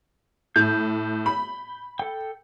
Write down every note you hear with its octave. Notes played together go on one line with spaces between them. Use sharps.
A2 G6
B5
A4 G5